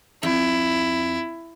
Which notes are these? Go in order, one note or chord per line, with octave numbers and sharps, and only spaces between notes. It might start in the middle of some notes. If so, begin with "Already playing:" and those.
F2 E4